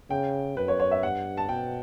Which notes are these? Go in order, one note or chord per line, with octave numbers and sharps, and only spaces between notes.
C#3 G5
F#2 B4
C#5
C#5
E5
G2 F#5
A5
B2 G5